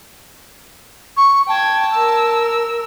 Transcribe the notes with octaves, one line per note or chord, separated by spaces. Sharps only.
C#6
G5 A5 G#6
A#4 E6